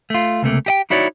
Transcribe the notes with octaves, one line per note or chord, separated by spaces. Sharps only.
A3 F4
C#2 C3 A3 A#3
G4 D#5 G5
D#4 E4 F#4 C#5 D5